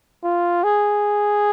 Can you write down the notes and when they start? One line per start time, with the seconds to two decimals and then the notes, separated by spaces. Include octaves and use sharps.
0.24 F4
0.64 G#4